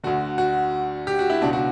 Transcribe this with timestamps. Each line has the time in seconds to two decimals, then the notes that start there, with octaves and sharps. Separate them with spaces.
0.03 D2 D3 F#4
0.38 F#4
1.07 G4
1.19 F#4
1.30 E4
1.42 C#2 B2 D4
1.53 F#4